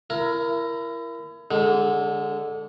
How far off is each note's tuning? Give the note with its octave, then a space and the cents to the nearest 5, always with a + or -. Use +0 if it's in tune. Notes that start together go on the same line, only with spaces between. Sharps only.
E4 +30 A#4 +10
D3 +5 G#3 -15 D4 -35